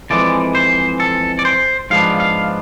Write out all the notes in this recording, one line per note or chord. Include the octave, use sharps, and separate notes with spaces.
F2 E3 G#3 D5
C5
A4
D5
C5
G#2 F3 G#3 B3 D4 F5
F5